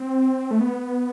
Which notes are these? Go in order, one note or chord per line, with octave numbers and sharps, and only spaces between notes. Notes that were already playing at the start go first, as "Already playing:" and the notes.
Already playing: C4
A3
B3